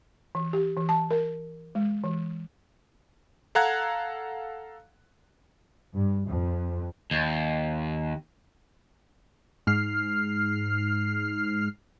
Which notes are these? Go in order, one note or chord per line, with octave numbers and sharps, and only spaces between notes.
E3
G4
E3
A5
A#4
G#3
E3
A4 F5 F#5 A#5 F#6 G#6
G2
F2
D#2
G#2 F6 C7